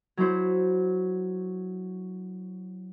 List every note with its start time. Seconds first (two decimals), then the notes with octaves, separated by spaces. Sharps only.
0.17 F#3 E4 C5